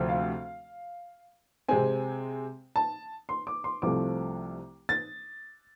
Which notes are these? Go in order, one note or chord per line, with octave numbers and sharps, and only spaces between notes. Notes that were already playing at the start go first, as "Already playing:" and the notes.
Already playing: D2 C3 F3 A3 C4
F5
C3 G#3 C4 G#5
A5
C6
D6
C6
C2 C3 F3 A3 D6
A6